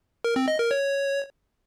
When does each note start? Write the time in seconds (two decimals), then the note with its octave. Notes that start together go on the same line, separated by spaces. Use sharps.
0.24 A#4
0.36 C4
0.48 D#5
0.59 A#4
0.71 C#5